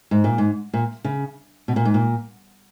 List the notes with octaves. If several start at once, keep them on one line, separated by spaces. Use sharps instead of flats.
G#2
A#2
G#2
A#2
C#3
B2
A#2
G#2
A#2